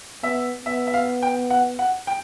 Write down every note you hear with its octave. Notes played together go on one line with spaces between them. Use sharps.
B3 E5
B3 E5
E5
F5
G5
F#5
F#5
G5